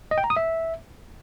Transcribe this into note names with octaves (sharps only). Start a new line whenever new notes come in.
D#5
G5
A#5
D#6
E5